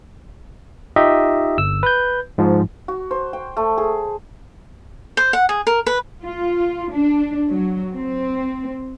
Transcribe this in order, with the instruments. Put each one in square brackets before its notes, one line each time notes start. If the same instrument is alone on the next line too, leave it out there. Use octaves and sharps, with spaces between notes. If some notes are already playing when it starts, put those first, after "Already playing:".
[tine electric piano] D#4 F4 G4 D#5 E5
G1 E6
B4 G6
G#2 F3
[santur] F#4
C5
G5
A3
G#4
[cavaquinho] C5
F#5
G#4
A#4
B4
[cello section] F4
D4
F#3
C4